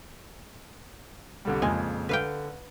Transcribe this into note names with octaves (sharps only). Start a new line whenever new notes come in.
C2 D3 G3
F2 A#2 C#3 G#3
D3 B4 F5 G5